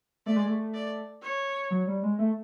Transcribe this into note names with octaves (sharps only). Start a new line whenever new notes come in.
A3 D5
G#3
A3
D5
C#5
F#3
G3
G#3
A3